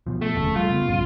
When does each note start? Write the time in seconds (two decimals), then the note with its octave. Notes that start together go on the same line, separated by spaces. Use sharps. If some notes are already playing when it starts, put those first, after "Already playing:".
0.07 B2 F3
0.21 A3
0.35 F1 D#2 C#3
0.56 G3 A3 F4
0.70 C#3 B3
0.88 A#1 G2 C#3